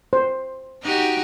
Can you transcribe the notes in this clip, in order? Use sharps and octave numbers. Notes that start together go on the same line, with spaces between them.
C5
D#4 F#4 G4